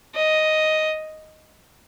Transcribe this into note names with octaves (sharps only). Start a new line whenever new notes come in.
D#5